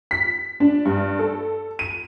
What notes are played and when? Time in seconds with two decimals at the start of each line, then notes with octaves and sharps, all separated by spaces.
0.11 B6
0.60 D4
0.85 G2
1.19 A4
1.79 D#7